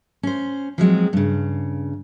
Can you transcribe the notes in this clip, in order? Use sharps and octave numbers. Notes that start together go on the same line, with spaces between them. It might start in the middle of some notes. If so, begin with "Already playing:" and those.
C#4 C5
F3 F#3 G#3 C4
G2 C#3